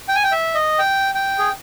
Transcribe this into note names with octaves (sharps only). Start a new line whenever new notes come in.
G5
G#5
G5
E5
D#5
G5
G5
G#4